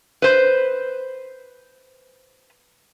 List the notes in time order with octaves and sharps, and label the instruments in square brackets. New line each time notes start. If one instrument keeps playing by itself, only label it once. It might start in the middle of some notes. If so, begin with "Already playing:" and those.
[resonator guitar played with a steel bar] B4 C5